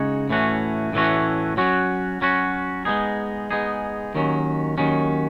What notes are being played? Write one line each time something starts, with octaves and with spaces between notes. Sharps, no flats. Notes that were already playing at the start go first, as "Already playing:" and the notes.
Already playing: C#3 G#3 D#4 F#4 C#5
A2 E3 A3 C#4 F#4
A2 E3 A3 C#4 F#4
F#3 C#4 F#4
F#3 C#4 F#4
G#3 B3 D#4 G#4
G#3 B3 D#4 G#4
D#2 D#3 F#3 C#4
D#2 D#3 F#3 C#4